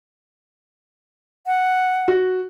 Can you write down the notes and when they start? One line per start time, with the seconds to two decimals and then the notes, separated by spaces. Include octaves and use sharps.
1.47 F#5
2.08 F#4